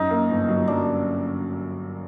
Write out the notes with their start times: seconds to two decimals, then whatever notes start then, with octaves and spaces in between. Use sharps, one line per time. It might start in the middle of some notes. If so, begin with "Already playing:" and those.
Already playing: F#2 D#4
0.10 A#3
0.30 G1
0.48 F#3
0.68 F#3 D4